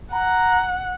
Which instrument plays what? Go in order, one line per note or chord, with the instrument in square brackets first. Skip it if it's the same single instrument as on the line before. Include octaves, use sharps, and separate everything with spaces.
[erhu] F#5 [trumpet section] A#5